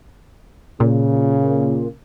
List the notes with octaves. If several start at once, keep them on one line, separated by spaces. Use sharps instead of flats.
A#2 C#3